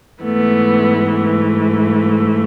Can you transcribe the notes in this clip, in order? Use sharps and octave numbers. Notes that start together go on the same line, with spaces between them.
G#2 E3 A3 B3
A3